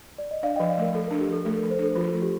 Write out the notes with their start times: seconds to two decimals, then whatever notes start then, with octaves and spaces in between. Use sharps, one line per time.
0.18 D5
0.31 D#5
0.43 D4 D5 F5
0.56 D#5 G5
0.60 F3
0.69 D5 F5
0.78 A3 A#4
0.94 F3 A4
1.07 A#4
1.11 D4
1.20 G4
1.29 F3 A4
1.45 A3 A4
1.58 A#4
1.62 F3
1.71 C5
1.79 D4 A4
1.96 F3 F4
2.13 A3
2.22 G4